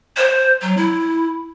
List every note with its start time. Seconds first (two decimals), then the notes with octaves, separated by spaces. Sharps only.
0.17 C5
0.62 F#3
0.77 E4